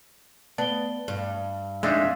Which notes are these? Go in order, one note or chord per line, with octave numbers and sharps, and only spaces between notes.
B3 D5 A5 G7
G2
F2 G#3 D4 D#4 E5